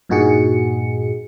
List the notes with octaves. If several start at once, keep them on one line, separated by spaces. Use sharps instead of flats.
G2 A#2 D#4 F#4 G#4 C#7